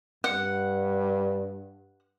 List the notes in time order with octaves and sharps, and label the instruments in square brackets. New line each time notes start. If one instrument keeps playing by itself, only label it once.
[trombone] G2 [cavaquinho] F#5